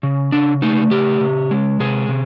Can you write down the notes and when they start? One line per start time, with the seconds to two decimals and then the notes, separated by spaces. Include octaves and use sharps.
0.03 C#3
0.32 C#3 D4
0.62 A3 D#4
0.91 C#3 G4
1.21 C#3
1.51 G#3
1.80 C3 G#4
2.09 C3